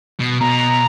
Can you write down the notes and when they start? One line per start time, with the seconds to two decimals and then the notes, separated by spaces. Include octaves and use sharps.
0.20 B2
0.40 B2 A#5